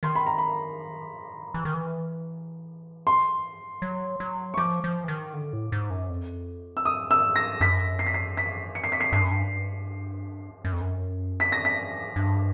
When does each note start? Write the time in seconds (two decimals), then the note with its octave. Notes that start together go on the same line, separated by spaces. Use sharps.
0.03 D#3 C6
0.15 B5
0.26 A#5
0.38 B5
1.54 E3
1.65 D#3
1.74 E3
3.07 C6
3.82 F#3
4.20 F#3
4.54 C#6
4.57 F3 D6
4.84 F3
5.04 E3
5.08 D#3
5.34 D3
5.53 A2
5.72 G#2
5.90 F#2
6.10 F2
6.77 E6
6.85 D#6
7.11 E6
7.36 A#6
7.61 F#2 B6
7.99 C7
8.06 B6
8.14 C7
8.37 B6
8.75 C#7
8.84 C7
8.92 B6
9.00 C7
9.12 G2 C7
9.22 F#2
9.31 G2
10.65 F#2
10.73 F2
10.81 F#2
11.40 B6
11.52 A#6
11.65 B6
12.16 G2